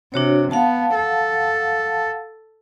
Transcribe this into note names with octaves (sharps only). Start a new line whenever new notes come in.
C3 D4 F#4 C#5
B3 F5 F#5 A5
A4